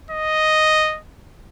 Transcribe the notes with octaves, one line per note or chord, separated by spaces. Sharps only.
D#5